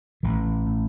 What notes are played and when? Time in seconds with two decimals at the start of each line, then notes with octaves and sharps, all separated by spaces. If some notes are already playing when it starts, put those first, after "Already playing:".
0.23 A1 E3
0.66 A2